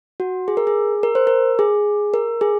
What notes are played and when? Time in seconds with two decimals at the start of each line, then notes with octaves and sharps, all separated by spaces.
0.20 F#4
0.48 G#4
0.57 A#4
0.67 G#4
1.03 A#4
1.15 C5
1.27 A#4
1.59 G#4
2.14 A#4
2.41 G#4